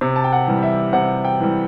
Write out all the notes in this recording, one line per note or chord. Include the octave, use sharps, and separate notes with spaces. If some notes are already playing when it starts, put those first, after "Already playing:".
C3
A5
G5
F#5
E3 G3
E5
C3 F#5
G5
E3 G3